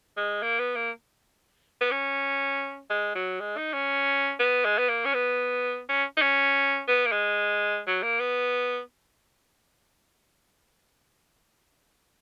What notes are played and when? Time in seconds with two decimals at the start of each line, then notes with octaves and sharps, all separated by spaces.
0.17 G#3
0.42 A#3
0.59 B3
0.75 A#3
1.81 B3
1.91 C#4
2.90 G#3
3.15 F#3
3.40 G#3
3.57 D#4
3.73 C#4
4.39 B3
4.65 G#3
4.78 B3
4.89 A#3
5.05 C#4
5.14 B3
5.89 C#4
6.17 D#4
6.22 C#4
6.88 B3
7.06 A#3
7.12 G#3
7.87 F#3
8.03 A#3
8.19 B3